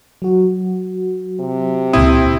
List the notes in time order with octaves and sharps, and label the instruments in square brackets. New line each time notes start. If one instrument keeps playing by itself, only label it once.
[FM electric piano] F#3 F#4
[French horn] C3
[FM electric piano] C#2 A#2 D#6 [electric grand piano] C4 E4